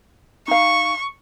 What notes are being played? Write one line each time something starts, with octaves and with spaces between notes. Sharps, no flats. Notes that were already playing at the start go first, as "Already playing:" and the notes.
D#4 F5 C#6